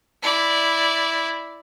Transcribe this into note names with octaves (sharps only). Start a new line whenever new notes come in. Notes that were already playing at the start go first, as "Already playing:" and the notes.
E4 D5